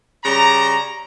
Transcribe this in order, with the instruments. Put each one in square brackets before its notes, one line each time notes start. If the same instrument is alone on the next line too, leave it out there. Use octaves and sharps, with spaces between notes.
[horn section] C#3 G3 A#5